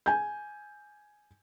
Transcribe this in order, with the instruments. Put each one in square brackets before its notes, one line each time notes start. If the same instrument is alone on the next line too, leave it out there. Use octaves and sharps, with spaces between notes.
[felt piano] G#5 G6